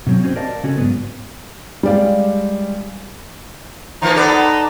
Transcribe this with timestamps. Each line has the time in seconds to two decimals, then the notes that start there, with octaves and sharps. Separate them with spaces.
0.07 B2 F#3 C4
0.23 C4 C#4 F#4 G#4 C5
0.35 G4 A#4 D5 D#5 F5 A5
0.64 C#3 C#4 F#4 A4 G#5
0.77 G#2 F#3 B3 B4
1.83 G3 G#3 D5 F5
4.02 E3 F3 A#3 D#4
4.16 B3 A4 D5